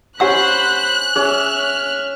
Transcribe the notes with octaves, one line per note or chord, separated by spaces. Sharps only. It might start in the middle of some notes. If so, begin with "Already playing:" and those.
C#4 G4 C5 F#5 G#5 B5 E6 F#6
C#4 G#4 E5 F6